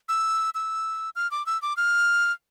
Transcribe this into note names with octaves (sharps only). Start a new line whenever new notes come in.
E6
E6
F6
D6
E6
D6
F6